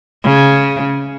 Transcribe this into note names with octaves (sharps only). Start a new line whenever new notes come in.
C#3